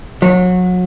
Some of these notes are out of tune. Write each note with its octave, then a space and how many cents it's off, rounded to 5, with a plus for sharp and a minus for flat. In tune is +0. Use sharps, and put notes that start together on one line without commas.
F#3 -30